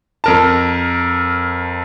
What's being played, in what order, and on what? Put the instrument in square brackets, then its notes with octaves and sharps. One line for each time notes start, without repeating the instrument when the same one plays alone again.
[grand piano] F2 A#4 A5